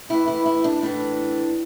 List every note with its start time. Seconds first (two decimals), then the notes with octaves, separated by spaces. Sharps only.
0.09 A2 E3 E4
0.28 E4
0.46 E4
0.64 D4
0.82 A2 E3 D4